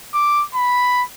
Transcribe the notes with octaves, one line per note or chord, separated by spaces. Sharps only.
D6
B5